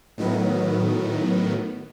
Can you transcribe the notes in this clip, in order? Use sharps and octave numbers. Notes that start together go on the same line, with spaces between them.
A2 D#3 F#3 B3